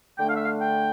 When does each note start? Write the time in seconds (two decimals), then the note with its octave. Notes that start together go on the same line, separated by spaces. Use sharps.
0.18 D3 A3 D4 G5
0.27 F5
0.36 E5
0.44 F5
0.60 G5